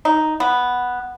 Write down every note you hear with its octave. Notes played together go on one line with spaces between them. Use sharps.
D#4
B3